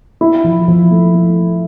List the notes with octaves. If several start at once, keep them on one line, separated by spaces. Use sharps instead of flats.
E4
F3
F3
A3
A3